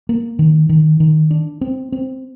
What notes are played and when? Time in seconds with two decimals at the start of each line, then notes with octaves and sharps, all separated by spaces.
0.09 A#3
0.39 D#3
0.69 D#3
1.00 D#3
1.31 D4
1.61 C4
1.92 C4